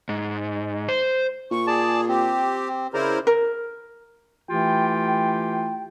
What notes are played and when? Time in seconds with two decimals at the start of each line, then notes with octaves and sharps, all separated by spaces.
0.09 G#2
0.89 C5
1.51 A#2 C#6
1.67 G#4 D5 A5
2.08 C4 G4
2.94 C#3 E4 A#4 C5 D5 A#5
3.27 A#4
4.49 E3 A3 E4 F4 G4 G5